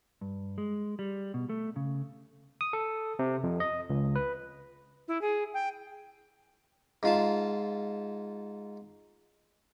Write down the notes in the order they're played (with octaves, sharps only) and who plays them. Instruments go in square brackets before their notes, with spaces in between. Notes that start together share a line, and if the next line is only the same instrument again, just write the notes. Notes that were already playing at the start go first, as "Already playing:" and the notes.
[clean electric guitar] G2
G#3
G3
B2
A3
C#3
[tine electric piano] D#6
A4
C3
F2
D#5
C#2
B4
[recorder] E4
G#4
G5
[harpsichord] G#2 F4 A5